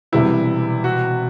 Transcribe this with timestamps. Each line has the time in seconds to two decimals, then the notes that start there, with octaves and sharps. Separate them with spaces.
0.12 E1 E2 C3 G3 B3 E4
0.84 F#4